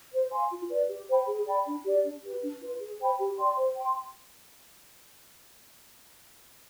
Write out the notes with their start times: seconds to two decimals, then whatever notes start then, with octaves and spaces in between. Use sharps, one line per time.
0.12 C5
0.32 F5 G#5 C6
0.51 F4
0.70 B4 D5
0.89 G4
1.08 C5 G5 B5
1.28 G#4
1.47 D5 G5 B5
1.66 D4
1.84 G4 D5
2.03 D4
2.23 G4 B4
2.42 D4
2.61 F4 B4
2.80 G#4
2.99 C5 G5 B5
3.19 G4
3.37 D5 G5 C6
3.56 C5
3.76 G5 C6